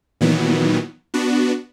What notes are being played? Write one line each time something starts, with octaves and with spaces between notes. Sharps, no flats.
A#2 D#3 E3 F#3 B3
B3 D4 F#4